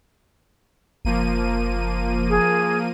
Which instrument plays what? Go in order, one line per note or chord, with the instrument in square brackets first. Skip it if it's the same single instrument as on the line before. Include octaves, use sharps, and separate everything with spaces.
[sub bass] F#1 [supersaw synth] F3 A#3 D#7
[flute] G#4